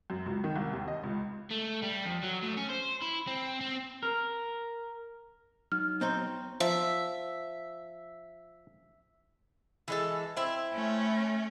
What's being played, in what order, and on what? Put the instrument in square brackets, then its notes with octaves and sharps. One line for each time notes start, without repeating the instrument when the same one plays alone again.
[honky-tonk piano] F#2
C#2
D#3
C2
D#2
D#5
C#2
[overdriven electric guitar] A3
G3
F2
F#3
A2
C#4
C5
E4
C4
C4
[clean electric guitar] A#4
[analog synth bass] F#3 [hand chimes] D#4 [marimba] F6
[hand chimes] B3 A#5 [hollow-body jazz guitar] C4 D#4 C5
[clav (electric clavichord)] F3 [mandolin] E5
[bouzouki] E3 G#3 A4
C4 E4
[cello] A3 C#4